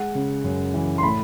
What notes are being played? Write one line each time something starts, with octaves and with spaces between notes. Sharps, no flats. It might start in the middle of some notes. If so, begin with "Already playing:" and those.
Already playing: G#3 F#5
C#3
F#2
E3
C6
A2 B5